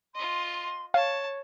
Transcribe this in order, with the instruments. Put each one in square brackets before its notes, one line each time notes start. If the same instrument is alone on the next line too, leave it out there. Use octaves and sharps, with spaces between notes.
[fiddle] F4 D#5 [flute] C6
[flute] C#5 [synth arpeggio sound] F5 [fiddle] A5